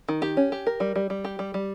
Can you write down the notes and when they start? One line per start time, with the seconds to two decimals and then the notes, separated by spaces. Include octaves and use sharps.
0.09 D#3
0.22 G4
0.37 C#4
0.52 G4
0.67 A#4
0.80 G3
0.96 G3
1.10 G3
1.25 G4
1.39 G3
1.54 G3